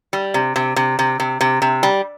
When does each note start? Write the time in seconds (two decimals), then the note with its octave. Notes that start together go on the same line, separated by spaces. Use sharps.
0.13 G3
0.34 C3
0.56 C3
0.76 C3
0.99 C3
1.20 C3
1.41 C3
1.62 C3
1.83 G3